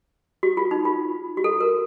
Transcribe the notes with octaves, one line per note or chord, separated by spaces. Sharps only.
F#4
F4
D#4
F4
F#4
A4
A#4